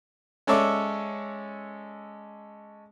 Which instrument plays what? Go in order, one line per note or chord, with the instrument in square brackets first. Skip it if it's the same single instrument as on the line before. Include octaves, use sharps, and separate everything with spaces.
[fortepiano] G#3 C#4 A4 C#5 D5 E5